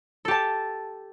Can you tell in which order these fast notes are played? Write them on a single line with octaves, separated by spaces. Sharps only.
A4 G4 A5